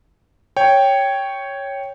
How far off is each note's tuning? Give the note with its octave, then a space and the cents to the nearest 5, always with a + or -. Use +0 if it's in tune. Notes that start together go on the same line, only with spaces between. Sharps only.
C#5 +0 G5 +0